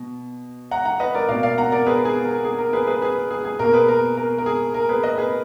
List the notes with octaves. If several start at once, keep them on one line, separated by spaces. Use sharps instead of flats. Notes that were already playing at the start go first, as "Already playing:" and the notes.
Already playing: B2
F#5 A#5
F#5 A#5
B4 D#5
A#4 D5
B2 A#3 D5 F5
D5 F5
F#5 A#5
A#4 D5
G#4 B4
G#4
A#4
G#4
A#4
G#4 B4
G#4 B4
G#4 B4
G#4
G#4
B2 A#3 A#4
G#4 B4
A#4
A#4
A#4
G#4
A#4
G#4 B4
B4 D#5
G#4 B4